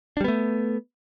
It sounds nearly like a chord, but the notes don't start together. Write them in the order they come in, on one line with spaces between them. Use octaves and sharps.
D4 G3 B3 A3